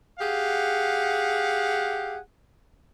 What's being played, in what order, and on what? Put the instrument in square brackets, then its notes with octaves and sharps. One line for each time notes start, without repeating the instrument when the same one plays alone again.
[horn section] G4 G#4 F5 F#5